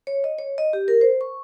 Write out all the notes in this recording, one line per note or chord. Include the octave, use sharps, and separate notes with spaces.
C#5
D#5
C#5
D#5
G4
A#4
C5
C#6